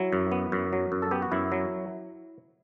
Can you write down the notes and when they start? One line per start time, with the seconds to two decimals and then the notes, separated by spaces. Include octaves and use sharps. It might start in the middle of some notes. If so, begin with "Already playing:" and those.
Already playing: F#3 E4
0.13 F#2
0.32 B3
0.52 F#2
0.73 F#3
0.92 F#2
1.02 A4
1.11 B3 G4
1.22 F#4
1.31 F#2 E4
1.52 F#3